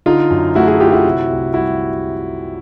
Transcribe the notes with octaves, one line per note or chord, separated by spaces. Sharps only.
D3 D#4 F4
F#2
A3 E4 F#4
F#4 G#4
F#3 F4 G4
E4 F#4
C3
C2
G3 E4 F#4